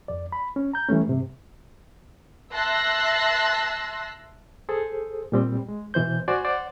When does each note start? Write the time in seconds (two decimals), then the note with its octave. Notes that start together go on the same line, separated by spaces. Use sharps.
0.08 F2 D5
0.32 B5
0.56 C#4
0.73 A#5 G6
0.88 E3 G3 A3 C#4
1.08 G2 C3
2.53 E5 A5 C6 E6 F#6 A#6
4.69 G#4 A4 C5
5.32 A#2 G3 C4
5.68 G#3
5.94 B2 E3 C5 G6
6.28 F#4 C5 D5 G#5
6.44 C5 D5 F#5